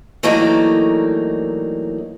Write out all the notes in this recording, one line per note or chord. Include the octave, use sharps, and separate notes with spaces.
E3 F#3 G3 A3 A#3 D#4